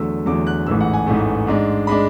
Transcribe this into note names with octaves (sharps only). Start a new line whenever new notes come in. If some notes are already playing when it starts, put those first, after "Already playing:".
Already playing: E2 D3 F#3 A3 E6
E2 D3 F#3 A3 D6
F#6
A1 G#2 E3 A3 E6
F#5
G#5
A1 G#2 E3 A3
G#2 G#3 D4
G#3 D4 B5